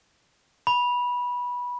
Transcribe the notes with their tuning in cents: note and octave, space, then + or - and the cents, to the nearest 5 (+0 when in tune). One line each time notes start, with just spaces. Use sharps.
B5 -15